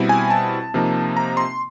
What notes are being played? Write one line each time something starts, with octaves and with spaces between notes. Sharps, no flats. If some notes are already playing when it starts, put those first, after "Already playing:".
Already playing: B2 G3 C4 E4
G#5
A5
C3 F3 A#3 D#4
A#5
C6